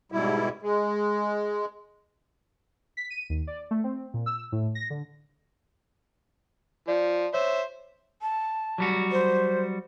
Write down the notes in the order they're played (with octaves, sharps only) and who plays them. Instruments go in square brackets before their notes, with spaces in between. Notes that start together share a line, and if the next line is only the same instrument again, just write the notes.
[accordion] G#2 B2 G3 E4
G#3
[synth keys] B6
D#7
D#2
D5
A3
C4
A#2
E6
A2
A#6
D3
[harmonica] F3 [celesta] D5
[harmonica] C5 E5 [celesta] C#5
[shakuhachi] A5
[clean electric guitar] F#3 G3 F#4
[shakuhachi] C5